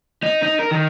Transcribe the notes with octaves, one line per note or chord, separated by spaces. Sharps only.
D#4
D#4
A#4
D#3